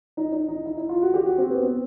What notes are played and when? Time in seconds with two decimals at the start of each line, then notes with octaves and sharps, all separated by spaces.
0.17 D#4
0.32 D#4
0.48 D#4
0.65 E4
0.77 E4
0.89 F4
1.02 F#4
1.14 G4
1.26 F#4
1.38 C4
1.50 B3
1.63 C4